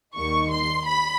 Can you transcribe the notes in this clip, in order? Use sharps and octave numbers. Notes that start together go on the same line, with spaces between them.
D#2 D#3 G3 A#3 D#4 C#6
C6
B5